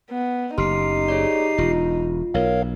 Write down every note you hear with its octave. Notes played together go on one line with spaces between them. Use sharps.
B3
F#1 D#4 G4 C6 F6 C7
G#4 C#5 D5
E1 F4
B1 A#4 C#5 F5